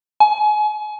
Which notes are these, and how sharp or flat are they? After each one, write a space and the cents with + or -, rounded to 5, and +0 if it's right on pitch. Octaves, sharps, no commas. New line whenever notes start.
G#5 +35